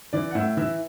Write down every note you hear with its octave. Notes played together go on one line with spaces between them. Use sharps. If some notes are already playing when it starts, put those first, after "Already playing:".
E3 D5
F#5
A2 E5
E3 E5